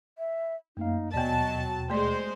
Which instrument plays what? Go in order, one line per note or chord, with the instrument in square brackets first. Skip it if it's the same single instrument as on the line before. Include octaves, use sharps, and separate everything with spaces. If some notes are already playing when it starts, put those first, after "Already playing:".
[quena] E5
[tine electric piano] F#2 A#3 F5 [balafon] A3 [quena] D#4
[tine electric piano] D#2 B2 G5 [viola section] F#3 A5 [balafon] B3 D5 [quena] D#5
[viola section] G#3 C5 [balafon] A3 D5 [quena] C6